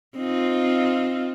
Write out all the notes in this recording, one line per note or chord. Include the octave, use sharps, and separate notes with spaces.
C4 D#4 F4